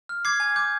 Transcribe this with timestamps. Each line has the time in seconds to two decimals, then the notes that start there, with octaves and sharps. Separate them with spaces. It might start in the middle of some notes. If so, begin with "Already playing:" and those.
0.09 F6
0.25 D6 G#6 C7
0.40 G#5 G#6
0.56 D6 G6